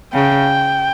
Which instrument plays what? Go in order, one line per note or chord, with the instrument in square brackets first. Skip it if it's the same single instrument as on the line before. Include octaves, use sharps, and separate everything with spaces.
[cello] C#3 [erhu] G5